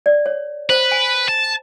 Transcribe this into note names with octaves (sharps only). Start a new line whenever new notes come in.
D5
C#5
B4 C5
G#5
A5